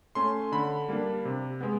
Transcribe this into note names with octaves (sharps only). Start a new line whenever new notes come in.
A3 C#4 C6
D3 B5
G3 A#3 D4
C3
G#3 B3